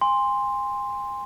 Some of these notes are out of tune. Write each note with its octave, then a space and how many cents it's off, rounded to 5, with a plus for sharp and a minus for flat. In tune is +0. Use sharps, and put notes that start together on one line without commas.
G#5 -35 C6 +0